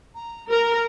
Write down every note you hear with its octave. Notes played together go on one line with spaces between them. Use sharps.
A#5
A#4 A#5